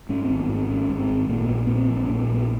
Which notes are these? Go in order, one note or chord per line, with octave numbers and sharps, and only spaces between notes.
G#2 C#4
C4
G#1
B3
G#2
C4
G#1 C#4
G#2
C4
G#1
A#2 A#3
A#1 B3
A#2 B3
C4
A#1
C4
C#4
A#2
A#3
B3
A#1 B3